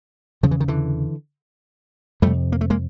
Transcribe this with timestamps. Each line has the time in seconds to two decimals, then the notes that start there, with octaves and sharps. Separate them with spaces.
0.43 E2 C#3 F3
0.51 E3
0.60 D#3
0.68 D3 E3
2.22 F2 C3 G3 A3
2.52 A#3
2.61 A3
2.70 G#3 A#3